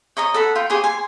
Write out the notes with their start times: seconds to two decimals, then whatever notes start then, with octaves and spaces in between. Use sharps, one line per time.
0.17 C#5 D#5 A#5 D#6
0.34 A4 F#5 B5
0.55 F4 G5
0.70 G4 G#4 C#5 G#5
0.84 G#5 C6